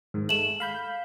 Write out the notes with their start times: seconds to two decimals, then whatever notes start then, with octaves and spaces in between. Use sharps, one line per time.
0.14 G#2 D#3
0.29 G#3 A3 E7 F#7
0.60 F5 B5 G6